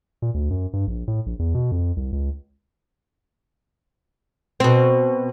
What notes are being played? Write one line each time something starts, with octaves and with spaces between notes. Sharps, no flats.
A#2
D2
F#2
G2
A#1
A2
A#1
E2
B2
F2
C2
C#2
B2 C4